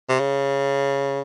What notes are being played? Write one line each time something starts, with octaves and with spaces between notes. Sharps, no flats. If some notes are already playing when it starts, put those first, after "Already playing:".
C3
C#3